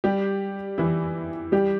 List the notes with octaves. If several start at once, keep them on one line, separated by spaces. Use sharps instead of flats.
G3 G4
E3 E4
G3 G4